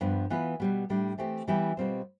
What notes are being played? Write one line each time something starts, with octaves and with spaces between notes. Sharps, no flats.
G2 F3 B3
E3 B3 F4 B4
B2 G3 B3
A2 G3 D4
E3 A3 C4 G4
E3 G3 B3 E4 G4
B2 G3 C4 F4 C5